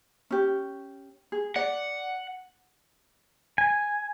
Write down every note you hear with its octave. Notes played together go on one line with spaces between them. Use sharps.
C#4 G4
G#4
D5 F#5
G#5